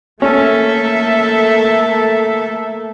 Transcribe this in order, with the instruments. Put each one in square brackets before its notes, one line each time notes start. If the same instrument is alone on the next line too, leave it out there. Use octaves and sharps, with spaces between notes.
[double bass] A3 A#3 [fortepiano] C#4 [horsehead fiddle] A4 E5